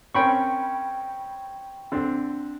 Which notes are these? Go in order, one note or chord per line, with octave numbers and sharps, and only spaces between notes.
C4 C#4 A#4 G5 B5 C#6
D3 C4